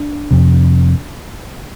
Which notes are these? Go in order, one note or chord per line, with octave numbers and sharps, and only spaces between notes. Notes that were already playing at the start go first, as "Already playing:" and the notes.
Already playing: D4
F2 C3